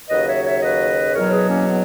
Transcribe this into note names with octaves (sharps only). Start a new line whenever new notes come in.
D#2 C#3 F#3 B4 D#5
C#5 E5
C#5 E5
B4 D#5
E2 B2 F#3 A#4 C#5
G#4 B4
A#3 C#4
B3